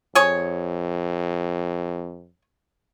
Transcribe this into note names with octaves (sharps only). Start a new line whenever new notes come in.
F2 G#4 C#5